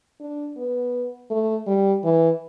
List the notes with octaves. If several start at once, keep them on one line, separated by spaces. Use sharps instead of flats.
D4
B3
A3
G3
E3